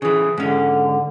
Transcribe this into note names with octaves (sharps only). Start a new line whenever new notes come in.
C#3 E3 G#4
G#2 D3 C#4